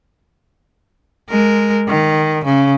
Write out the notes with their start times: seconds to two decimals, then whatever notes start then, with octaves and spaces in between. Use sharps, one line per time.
1.30 G#3 A#4
1.88 D#3
2.45 C#3